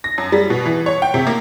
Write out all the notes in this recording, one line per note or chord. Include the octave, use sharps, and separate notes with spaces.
A#6
F#2
G3
B2
E3
C#5
G5
C3
A#3